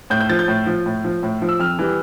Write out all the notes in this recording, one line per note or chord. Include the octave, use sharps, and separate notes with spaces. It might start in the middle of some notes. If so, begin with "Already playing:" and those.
A2 G6
G6
F3 A6
G6
A2
F3
A2
F3
A2
F3
E6
F2 F6
E3 G3